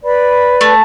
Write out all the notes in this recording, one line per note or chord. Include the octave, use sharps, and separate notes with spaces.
B4 D5 B5
A3